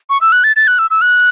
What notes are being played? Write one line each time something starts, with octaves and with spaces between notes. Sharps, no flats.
C#6
E6
F#6
A6
A6
F#6
E6
E6
F#6